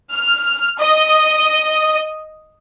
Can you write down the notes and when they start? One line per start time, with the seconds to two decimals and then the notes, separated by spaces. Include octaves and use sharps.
0.11 F6
0.80 D#5